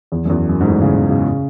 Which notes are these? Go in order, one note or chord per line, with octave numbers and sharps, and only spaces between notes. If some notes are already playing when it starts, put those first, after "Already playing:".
E2
F#2
E2
F#2
G#2
A2
C#3
C#3
C#3